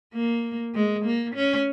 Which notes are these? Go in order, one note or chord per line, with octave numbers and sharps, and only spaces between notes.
A#3
G#3
A#3
C#4